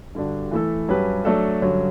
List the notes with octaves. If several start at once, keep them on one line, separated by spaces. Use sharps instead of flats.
G2 D3 G3 D4 F#4
E3 A3 E4 A4
G2 F#3 C#4 G4 B4
F#3 A3 D4 A4
G2 D3 F#3 C#4